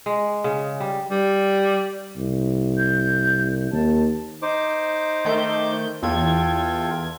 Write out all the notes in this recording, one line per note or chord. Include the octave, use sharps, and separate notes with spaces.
G#3
C#3
G3
G3
C2
G6
D#2 A5
D#4 C5 D6
D#3 A3 G6
E2 F4 A4 G5 G#6